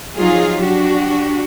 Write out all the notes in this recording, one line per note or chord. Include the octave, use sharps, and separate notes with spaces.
F3 F#3 D#4 F4 G#4
D4 F#4 G4